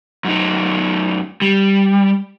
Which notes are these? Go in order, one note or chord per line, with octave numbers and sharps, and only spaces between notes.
F#2 D#4
G3